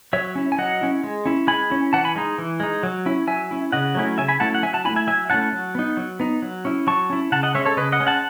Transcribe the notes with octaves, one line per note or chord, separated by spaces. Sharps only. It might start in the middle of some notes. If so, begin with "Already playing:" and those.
F#3 C#5 E5
C#4 E4
G#5
F#3 D#5 F#5
C#4 E4
G#3
C#4 E4
G#3 G#5 B5
C#4 E4
E3 F#5 A5
G#5 B5
G#3 D#4
E3
G#3 D#4
F#3
C#4 E4
F#3 E5 G#5
C#4 E4
C#3 D#5 F#5
F#3 A3 C#4 E4
C#3 E5 G#5
G#5 B5
F#3 A3 C#4 E4 F#5 A5
F#5
F#3 E5 G#5
F#5 A5
A3 C#4 E4 G#5 B5
E5 G#5
F#3 E5 G#5
A3 C#4 E4 F#5 A5
F#3
B3 D#4
F#3
B3 D#4
F#3
C#4 E4
F#3 A5 C#6
C#4 E4
C#3 F#5 A5
D#5 F#5
G#3 C#4 C#5 E5
A4 C#5
C#3 B4 D#5
D#5 F#5
G#3 C#4
F#5 A5